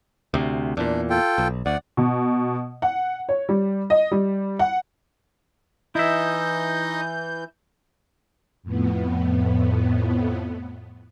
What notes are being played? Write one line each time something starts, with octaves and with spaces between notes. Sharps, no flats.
D2 C3
E2 A#2 D4
F4 A4 G5
B1
D2 D5 F#5
B2
F#5
C#5
G3
D#5
G3
F#5
E3 D#4 E4 D#5 E5 G6
F2 A2 B3